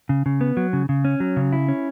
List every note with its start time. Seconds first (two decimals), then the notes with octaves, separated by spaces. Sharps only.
0.09 C#3
0.26 C#3
0.41 B3
0.57 F#3
0.73 C#3
0.89 C#3
1.05 C#4
1.20 F#3
1.37 C#3
1.53 E4
1.68 C#4